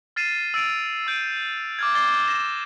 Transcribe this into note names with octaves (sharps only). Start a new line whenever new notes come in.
F6 A6 C7 D#7 E7
E6 A6 D7 D#7 F7
E6 G6 D7 D#7
D6 F6 G#6
D6 F6 A6 C7 G7
A#6 E7